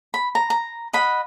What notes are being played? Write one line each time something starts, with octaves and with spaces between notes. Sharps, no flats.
B5
A#5
A#5
D#5 F#5 B5